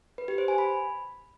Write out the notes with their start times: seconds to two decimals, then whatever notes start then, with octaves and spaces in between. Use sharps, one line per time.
0.18 B4
0.28 G4
0.38 C5
0.48 G#5
0.58 B5